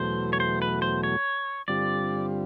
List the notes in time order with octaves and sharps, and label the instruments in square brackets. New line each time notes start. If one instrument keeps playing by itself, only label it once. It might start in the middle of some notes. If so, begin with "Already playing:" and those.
Already playing: [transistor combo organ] E2 B2 F#3 A3 [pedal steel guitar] C5
[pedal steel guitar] C#5
C5
B4
C5
C#5
[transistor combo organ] G2 D3 G3 C4 F4 [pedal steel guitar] D5